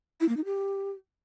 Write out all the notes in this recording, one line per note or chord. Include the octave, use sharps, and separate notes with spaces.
E4
A#3
D#4
G4